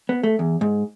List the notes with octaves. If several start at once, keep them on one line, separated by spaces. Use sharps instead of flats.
B3
A3
E2
G#2